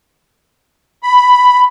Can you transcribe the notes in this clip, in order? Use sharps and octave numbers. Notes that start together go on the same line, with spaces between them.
B5